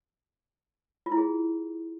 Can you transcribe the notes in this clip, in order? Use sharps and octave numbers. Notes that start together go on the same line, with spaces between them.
F4
E4
G#4